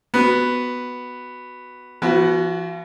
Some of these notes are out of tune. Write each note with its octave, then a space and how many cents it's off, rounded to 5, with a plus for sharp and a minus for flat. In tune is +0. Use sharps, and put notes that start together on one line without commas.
B3 +0 F#4 +0 B4 +0
F3 -45 B3 -5 F#4 +5